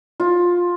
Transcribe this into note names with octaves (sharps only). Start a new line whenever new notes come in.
F4